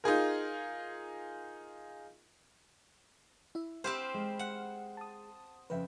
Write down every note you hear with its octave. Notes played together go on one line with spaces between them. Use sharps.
D#4 F4 G#4 A#4
E4 E5
C4 G4 C5 B5 F6
G#3
F#5
A5 D#6
F2 C#3 B4 E5 G5